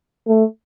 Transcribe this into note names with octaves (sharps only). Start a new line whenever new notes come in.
A3